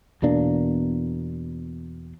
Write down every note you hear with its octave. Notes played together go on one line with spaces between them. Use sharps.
E2 B2 A#3 D4